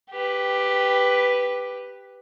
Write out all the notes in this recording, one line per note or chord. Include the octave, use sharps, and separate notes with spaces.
G4 B4